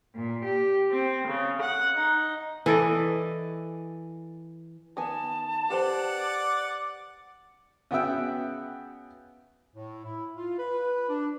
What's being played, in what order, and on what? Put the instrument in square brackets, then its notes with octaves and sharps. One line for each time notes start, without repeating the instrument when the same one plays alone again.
[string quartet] A#2
G4
C4
C#3
F#5
D#4
[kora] E3 A4 D5 D#5
[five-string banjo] D#3 B3 G#5 [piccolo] A5
[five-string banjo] G4 B4 C5 [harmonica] D5 F#5
[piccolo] D6
[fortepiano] C#3 B3 F#4 E5 G5
[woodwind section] A2
E4
F4
B4
D4